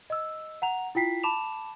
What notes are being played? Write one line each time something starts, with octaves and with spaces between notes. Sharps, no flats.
D#5 E6
F#5 A#5 F7
E4 F4 G5 B6 C7
A5 B5 D6 E7 F7